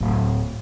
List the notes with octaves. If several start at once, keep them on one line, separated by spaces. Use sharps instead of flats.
D1